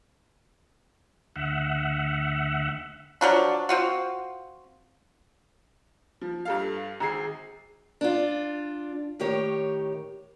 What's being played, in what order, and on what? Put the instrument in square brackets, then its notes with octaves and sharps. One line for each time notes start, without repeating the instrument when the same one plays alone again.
[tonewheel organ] D2 E5 F#5
[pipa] F3 F#3 D4
C4 F4 F#4
[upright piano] F3
G2 A4 F5
G#1 G#4 C7
[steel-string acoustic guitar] D4 F4
A2 D#3 G4 C#5